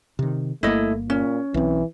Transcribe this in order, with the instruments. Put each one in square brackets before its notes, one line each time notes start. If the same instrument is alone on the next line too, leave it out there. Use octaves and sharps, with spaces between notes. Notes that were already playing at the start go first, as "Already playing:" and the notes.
[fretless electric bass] C3 D#3
[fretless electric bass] G1 A#3 [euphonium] A3 [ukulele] E4 D#5
[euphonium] A#2 [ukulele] C#4
[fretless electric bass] B1 C4 [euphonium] E3